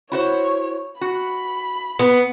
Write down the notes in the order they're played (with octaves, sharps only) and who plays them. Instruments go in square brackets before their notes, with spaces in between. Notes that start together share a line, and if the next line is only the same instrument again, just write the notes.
[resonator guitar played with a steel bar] E4 F#4 C5 [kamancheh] C#5
[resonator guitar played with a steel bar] F#4 [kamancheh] B5
[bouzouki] B3